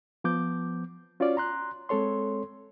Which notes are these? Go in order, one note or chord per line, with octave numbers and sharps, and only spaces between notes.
F3 B3 D6 G6
C#4 F4 F#4 C#5 D5
A#5 C6 F#6
G#3 C4 A4 C#5 C6